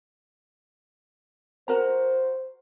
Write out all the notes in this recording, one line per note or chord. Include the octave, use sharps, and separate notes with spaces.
F#4 A#4 C5 A#5